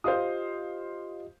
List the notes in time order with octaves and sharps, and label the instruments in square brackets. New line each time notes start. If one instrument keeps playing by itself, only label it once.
[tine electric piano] F4 G4 D#5 [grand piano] C5 F5 D#6